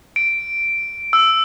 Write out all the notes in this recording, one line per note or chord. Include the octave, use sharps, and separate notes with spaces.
D7
E6